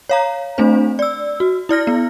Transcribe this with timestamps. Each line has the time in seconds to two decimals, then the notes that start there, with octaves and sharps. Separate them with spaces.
0.09 C#5 F5 A#5
0.58 A3 C4 D4 C5
0.99 D5 E6
1.40 F#4
1.69 E4 D5 F6 A#6
1.87 B3